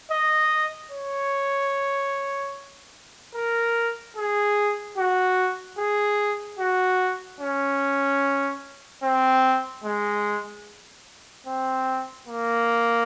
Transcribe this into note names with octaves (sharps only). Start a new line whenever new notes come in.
D#5
C#5
A#4
G#4
F#4
G#4
F#4
C#4
C4
G#3
C4
A#3